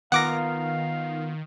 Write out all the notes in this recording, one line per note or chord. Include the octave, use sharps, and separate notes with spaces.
D#3 B3 F4 A#4 F5 F#5 D6 A#6